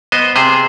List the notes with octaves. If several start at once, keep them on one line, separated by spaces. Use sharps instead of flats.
B3 C5 D#5
C3 G#4 C5